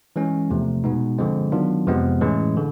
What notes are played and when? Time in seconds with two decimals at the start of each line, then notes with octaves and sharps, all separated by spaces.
0.16 E3 G#3 C#4
0.50 E2 C3 F3 A3
0.84 B2 G#3 B3 D#4
1.18 D3 F3 G#3 C4
1.52 D#3 F#3 B3 D4 F4
1.87 F2 C3 F3 G#3 B3
2.21 A2 E3 G#3 C#4
2.57 D3